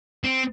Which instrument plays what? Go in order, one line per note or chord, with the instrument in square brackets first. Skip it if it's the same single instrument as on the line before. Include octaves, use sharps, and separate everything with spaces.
[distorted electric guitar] C4